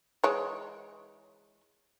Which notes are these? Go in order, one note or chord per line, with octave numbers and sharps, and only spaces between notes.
E3 G#3 C#5